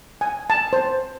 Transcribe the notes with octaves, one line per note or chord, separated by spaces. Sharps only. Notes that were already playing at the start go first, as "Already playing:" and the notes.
G#5
A5
C5